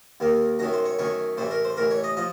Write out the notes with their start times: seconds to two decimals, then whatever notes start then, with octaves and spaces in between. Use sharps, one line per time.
0.20 D#2 D#3 A#3
0.59 F#2 D#3 A3 A#5
0.73 C5
0.85 C#5
0.99 F#2 D#3 A3 C#5
1.37 A1 A2 A3 C5
1.51 A#4
1.64 C5
1.77 A1 A2 A3 A#4
1.91 C#5
2.03 D#5
2.17 F3 D#5